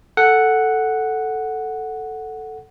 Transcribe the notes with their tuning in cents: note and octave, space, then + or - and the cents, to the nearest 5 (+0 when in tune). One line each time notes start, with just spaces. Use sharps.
A4 +0 F#5 +0